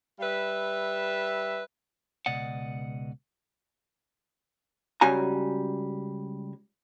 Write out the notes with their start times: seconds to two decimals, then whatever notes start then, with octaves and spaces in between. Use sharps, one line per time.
0.20 G3 B4 E5
2.26 C#2 B2 D5 D#5 F#5
5.01 C#2 G3 C#4 F#4 G#5 A#5